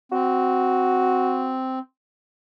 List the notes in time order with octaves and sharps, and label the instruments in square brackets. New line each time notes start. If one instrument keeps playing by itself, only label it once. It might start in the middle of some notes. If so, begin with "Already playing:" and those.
[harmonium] C4 [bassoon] F#4